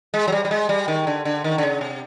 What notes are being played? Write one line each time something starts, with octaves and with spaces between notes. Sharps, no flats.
G#3
F#3
G3
G3
G#3
G3
D#3
D3
D3
D#3
D3
C#3
C3